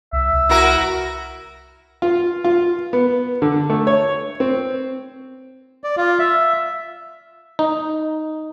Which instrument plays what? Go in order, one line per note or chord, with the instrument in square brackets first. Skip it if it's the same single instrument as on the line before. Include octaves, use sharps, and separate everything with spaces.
[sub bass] C2 [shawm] E5
[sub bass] C2
[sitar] E4 F#4 A#4
[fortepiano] F4
F4
B3
D3
A3
C#5
C4
[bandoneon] D5
F4
E5
[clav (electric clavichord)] D#4